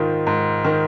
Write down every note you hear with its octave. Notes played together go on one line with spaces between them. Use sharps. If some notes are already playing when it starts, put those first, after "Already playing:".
Already playing: G#2 D#3 F4
G#2
D#3